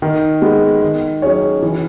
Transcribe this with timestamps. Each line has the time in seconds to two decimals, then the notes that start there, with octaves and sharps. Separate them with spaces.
0.02 D#3
0.42 G#3 B3
0.82 D#3
1.22 F#3 C#4 G#4 C#5
1.62 E3